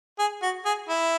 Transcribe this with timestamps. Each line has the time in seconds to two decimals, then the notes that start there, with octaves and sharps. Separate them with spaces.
0.19 G#4
0.43 F#4
0.65 G#4
0.89 E4